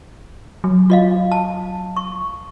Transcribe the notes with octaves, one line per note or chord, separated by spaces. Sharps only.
F#3
F4 D#5 F5
A5
C#6